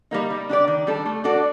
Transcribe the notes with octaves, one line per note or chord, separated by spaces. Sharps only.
G3 A#3 D#4
G3
D4 G4 D5
D#3
G3 D4 A4
A3
D4 F#4 A4 D5